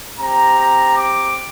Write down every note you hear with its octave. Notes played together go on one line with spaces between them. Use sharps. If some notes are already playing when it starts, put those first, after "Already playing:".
C4 G4 A#5
D6